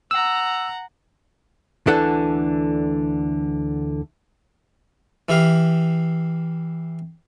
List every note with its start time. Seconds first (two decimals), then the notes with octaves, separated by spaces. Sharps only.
0.11 F#5 A#5 E6
1.87 D2 D3 E3 D4 A4 F#5
5.29 E3 E4 G4 F5